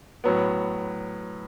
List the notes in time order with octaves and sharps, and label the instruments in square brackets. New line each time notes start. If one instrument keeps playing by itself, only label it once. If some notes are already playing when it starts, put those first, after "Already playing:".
[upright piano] A2 F#3 B3